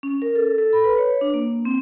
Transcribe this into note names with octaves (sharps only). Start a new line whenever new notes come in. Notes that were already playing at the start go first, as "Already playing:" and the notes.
C#4
A#4
A4
A4
B5
B4
C#5
D4
A#3
C4